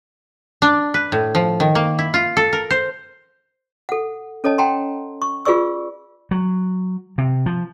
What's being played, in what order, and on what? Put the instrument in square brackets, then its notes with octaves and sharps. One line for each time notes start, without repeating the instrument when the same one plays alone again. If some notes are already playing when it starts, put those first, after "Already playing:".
[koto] D4
B4
A2
F3
D#3
A#3
E4
F4
A4
A#4
C5
[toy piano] A4 F#5
C#4 A4 C#5 D#5 A5
F#5 G5 A5 A#5 C6
C#6
F4 G#4 B4 D5 C#6 E6
[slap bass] F#3
C3
F3